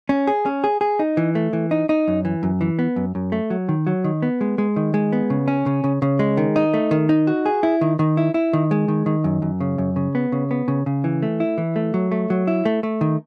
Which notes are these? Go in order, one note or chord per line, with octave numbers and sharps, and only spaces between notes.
C#4
G#4
C#4
G#4
G#4
D#4
E3
A3
E3
D#4
D#4
F#2
E3
F#2
E3
B3
F#2
F#2
A3
F#3
D#3
F#3
D#3
B3
G#3
G#3
D#3
G#3
B3
C#3
C#4
C#3
C#3
C#3
G#3
D#3
D#4
A3
D#3
D#4
F#4
G#4
E4
D#3
D#3
E4
E4
D#3
G#3
D#3
D#3
F#2
F#2
C#3
F#2
C#3
B3
C#3
B3
C#3
C#3
E3
A3
E4
E3
A3
F#3
A3
F#3
E4
A3
A3
D#3